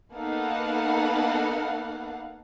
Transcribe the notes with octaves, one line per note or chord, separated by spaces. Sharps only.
A#3 B3 D#4 A4 F5 F#5